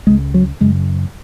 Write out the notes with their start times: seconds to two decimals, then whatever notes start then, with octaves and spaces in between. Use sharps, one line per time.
0.07 C#2 C#3 G#3
0.34 F#3
0.60 F#2 C#3 G#3